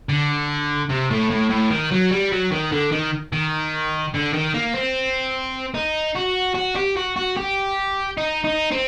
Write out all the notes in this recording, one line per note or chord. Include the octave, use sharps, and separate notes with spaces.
D3
C3
A2
A2
A2
D#3
F#3
G3
F#3
D#3
D3
D#3
D#3
D3
D#3
A#3
C4
D#4
F#4
F#4
G4
F#4
F#4
G4
D#4
D#4
C4